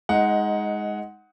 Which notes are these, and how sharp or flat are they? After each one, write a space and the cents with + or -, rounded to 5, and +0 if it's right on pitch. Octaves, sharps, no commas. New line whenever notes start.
G#3 +0 D#4 +20 F#5 +0